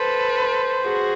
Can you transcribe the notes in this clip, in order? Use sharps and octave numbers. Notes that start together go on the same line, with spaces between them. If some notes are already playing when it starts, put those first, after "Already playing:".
Already playing: A4 B4 C5
F#4 G#4